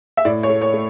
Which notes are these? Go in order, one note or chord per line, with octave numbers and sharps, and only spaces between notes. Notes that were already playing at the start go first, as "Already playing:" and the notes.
E5
A2 D5
C#5
A3
C#5
A3